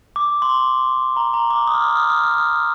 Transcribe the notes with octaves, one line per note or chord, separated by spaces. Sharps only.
D6
C6
A#5
A#5
D6
D#6
F6
D#6
F6
D#6
F6
D#6
F6
D#6
F6
D#6